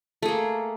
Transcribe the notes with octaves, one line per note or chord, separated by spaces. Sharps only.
A3 A#3 G#4